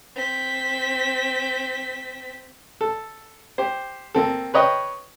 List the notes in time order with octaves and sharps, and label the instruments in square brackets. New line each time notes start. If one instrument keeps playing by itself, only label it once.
[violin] C4 B6
[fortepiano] A4
G4 C5
A#3 C4 A4
B4 C#5 D#5 G5